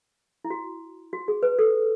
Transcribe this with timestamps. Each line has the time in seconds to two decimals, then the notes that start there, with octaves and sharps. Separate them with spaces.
0.45 E4
0.50 F#4
1.13 F#4
1.28 G#4
1.43 B4
1.59 A4